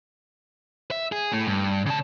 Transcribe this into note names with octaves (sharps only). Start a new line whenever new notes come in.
E5
G#4
A2 A3
G2
C#3 A5